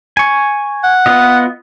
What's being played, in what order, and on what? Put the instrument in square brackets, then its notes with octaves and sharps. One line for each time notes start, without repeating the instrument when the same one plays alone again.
[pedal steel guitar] G#5 C#6
[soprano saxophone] F#5
[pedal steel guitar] B3 F4 D#5